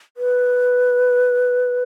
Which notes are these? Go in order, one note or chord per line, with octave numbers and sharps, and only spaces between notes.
B4